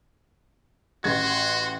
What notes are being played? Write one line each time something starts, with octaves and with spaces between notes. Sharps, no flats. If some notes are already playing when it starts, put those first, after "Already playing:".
A1 F#4 F#5 C6 G#6